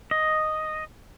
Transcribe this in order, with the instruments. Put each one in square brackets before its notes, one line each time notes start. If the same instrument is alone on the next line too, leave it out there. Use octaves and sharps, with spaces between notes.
[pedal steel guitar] D#5